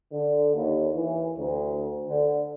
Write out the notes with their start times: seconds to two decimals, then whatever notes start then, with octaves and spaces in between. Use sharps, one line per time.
0.12 D3
0.55 D#2
0.95 E3
1.38 D2
2.08 D3